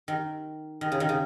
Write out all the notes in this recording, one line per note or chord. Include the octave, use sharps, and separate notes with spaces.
D#3
D#3
C#3
D#3
C#3